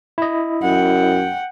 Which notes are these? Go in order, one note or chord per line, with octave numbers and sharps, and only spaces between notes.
E4 D#5
F#2 F#5 G5